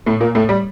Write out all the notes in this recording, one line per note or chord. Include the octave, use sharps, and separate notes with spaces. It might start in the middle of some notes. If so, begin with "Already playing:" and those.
A2 A3
A#2 A#3
A2 A3
G3